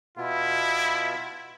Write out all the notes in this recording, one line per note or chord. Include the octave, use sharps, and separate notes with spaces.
B2 B3 E4 F4